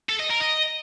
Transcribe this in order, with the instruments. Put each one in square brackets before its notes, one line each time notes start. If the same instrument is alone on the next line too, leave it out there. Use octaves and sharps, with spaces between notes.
[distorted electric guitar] A4
D#5
A#4
D#5